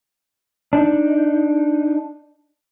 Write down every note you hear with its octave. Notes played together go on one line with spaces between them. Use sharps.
D4 D#4